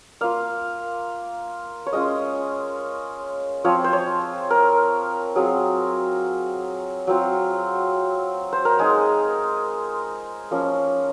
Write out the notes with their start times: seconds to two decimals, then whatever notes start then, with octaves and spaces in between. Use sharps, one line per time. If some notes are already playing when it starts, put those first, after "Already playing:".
0.21 A#3 F4 F5
1.86 C#5
1.93 G#3 C#4 F4 D#5
3.64 F3 C4 F4 C#5
3.84 C5
3.93 C#5
4.50 A#4
5.35 F#3 C4 F4 G#4
7.07 F#3 C4 F4
8.53 C5
8.65 A#4
8.79 G#3 D#4 G#4
10.51 F3 A#3 C#4